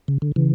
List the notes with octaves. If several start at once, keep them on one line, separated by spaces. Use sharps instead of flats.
C#3
D3
C#3 E3